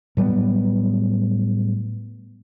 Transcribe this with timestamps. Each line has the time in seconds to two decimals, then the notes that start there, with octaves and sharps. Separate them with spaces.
0.17 A2 F#3 G3 B3